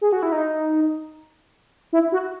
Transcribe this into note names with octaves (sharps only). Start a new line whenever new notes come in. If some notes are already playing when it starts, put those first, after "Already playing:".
G#4
F#4
E4
D#4
E4
F#4